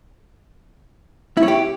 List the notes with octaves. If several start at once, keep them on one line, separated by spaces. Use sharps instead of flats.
E4
C#5
G4